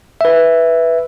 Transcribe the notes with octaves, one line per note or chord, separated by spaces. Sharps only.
B4 E5